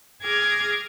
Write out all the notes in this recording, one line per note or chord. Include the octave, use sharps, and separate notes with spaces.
G#4 D6 F6 G#6 A#6